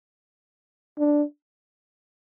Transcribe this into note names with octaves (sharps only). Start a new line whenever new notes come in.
D4